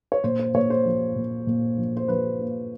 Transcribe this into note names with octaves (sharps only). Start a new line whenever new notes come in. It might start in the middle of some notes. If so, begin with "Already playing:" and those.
C#5
A#2 C5
C5
A#2 C#5
C5
F3
A#2
A#2
F3
C5
F3 B4
A#3